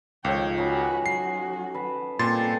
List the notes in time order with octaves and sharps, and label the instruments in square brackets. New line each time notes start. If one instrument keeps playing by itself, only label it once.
[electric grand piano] C#2 [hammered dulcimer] D#3 F3 A4 [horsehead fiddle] C#5 G5
[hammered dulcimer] C#4 D#4 [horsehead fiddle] F#4 B4
[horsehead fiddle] F#3 F#4 [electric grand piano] C7
[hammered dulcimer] B4 A5
[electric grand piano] A#2 C6 A6 [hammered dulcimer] G3 G#5 [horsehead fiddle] C4 A4